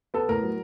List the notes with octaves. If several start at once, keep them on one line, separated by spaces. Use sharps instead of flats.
B3 A4
A2 A#4
F#3